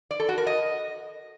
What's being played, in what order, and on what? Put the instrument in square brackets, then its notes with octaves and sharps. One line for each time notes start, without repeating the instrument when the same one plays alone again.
[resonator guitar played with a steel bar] D5
A4
F#4
A#4
D#5